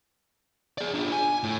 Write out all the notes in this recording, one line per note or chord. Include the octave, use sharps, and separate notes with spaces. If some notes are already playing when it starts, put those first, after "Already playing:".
G#4 D5
D4 F4
G#5
A2